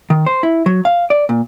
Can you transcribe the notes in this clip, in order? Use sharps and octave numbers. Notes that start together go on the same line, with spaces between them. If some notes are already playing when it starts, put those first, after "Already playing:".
D#3
C5
E4
F#3
F5
D5
A#2